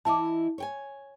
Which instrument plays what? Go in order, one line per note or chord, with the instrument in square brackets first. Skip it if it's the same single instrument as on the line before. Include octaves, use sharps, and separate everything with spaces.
[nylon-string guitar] E3 E4 D#5 [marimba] A5 D6
[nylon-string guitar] C#5 G5 G#5